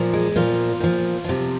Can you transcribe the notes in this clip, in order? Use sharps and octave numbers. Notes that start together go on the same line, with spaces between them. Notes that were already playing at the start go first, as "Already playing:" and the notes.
Already playing: A#2 F3
G#3
A#2 F3 F4
A#2 F3
C3 F3